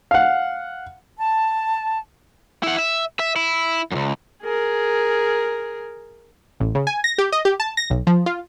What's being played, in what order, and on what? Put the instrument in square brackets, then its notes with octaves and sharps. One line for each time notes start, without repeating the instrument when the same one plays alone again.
[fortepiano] F5 F#5
[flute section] A5
[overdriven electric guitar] E4 F#5
E5
E5
E4
C#2 F#2
[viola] G#4 A#4
[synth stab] A1
C#3
G#5
A#6
G4
D#5
G4
A5
A#6
B1
F3
F4